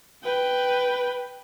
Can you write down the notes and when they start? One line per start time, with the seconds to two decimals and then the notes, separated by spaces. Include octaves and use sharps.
0.24 B4 G5